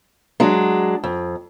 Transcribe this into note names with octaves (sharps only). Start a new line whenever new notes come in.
F#3 G#3 D4
F2